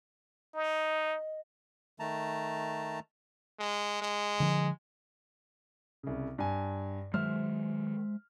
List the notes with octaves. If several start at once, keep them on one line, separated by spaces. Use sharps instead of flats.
D#4 D#5
D#3 A3 A5 A#5
G#3
G#3
D3 F3
C2 C#3
G2 G#5
D#3 F#3 G#3 C5 E5 F6